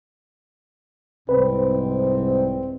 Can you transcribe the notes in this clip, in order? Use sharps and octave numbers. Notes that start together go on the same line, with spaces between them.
C2 G#2 C4 B4